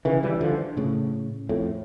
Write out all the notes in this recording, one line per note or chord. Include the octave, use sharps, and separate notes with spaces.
C#3 E3
E3 G3
D3 F3
A2 C#3
F2 A2